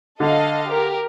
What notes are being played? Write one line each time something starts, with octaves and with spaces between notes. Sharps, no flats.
D3 A4 D#5 F5
G4 A#4